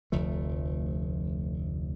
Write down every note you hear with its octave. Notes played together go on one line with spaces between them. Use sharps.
F1 D2 F3 A3